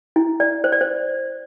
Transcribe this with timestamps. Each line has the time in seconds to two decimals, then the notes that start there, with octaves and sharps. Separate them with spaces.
0.16 E4
0.40 D5
0.64 C5
0.72 D5
0.81 C5